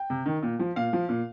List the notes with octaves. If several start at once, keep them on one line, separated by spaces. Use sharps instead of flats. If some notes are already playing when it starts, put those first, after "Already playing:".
Already playing: G5
C3
D#3
A#2
F3
A#2 F5
F3
A#2